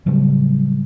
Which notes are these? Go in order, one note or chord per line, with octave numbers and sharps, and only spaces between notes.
A2 C#3 F#3 G3